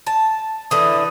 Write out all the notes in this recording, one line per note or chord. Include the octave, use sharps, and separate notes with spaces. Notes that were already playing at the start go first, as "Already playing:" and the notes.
A5
D3 E3 D#6